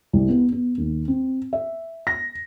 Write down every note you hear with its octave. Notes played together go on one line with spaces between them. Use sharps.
C2
B3
B3
D#2
C4
E5
A#6